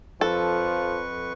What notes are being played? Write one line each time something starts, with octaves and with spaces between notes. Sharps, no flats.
F2 F3 A4 B4 C#6